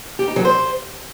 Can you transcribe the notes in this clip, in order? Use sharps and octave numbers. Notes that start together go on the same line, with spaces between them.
G4
D#4
F#3
C5